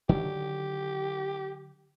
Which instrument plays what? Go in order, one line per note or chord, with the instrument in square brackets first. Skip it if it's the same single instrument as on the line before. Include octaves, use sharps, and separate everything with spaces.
[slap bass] D3 D#3 F#3 [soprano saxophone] G4